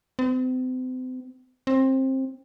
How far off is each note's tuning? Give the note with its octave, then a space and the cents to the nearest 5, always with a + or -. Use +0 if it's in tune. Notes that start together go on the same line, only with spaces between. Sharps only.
C4 -40
C4 +20